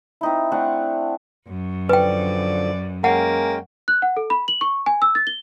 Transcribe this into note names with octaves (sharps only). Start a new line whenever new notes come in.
C4 D#4 E4
A3 C4 D4 F#5
F#2
D3 F3 B4 D5 G5
G#3 A#3 C#4 F#5 G5
F#6
F#5
A4
B5
F#7
C#6
G#5
E6
A6
G7